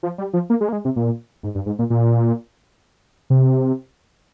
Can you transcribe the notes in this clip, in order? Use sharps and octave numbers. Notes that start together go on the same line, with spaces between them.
F3
G3
F3
A#3
G#3
A#3
G#3
C3
A#2
G#2
G2
G#2
A#2
A#2
C3